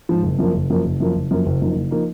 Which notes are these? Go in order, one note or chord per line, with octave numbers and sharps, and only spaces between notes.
G#2 F3
F#1
F#2 F3 A#3
F#1
F#2 F3 A#3
F#1
F#2 F3 A#3
F#1
F#2 F3 A#3
F#1
F#2 F3 A#3 D#4
F#1
F3 A#3 D#4